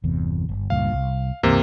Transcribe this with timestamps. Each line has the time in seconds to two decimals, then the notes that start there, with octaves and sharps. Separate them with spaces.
0.03 G1 E2 C3
0.49 G1
0.70 C#2 G2 A#2 F5
0.93 C2
1.43 C#2 G2 C3 E3 A#3